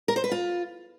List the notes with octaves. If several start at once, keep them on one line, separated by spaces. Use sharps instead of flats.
A#4
C5
B4
F4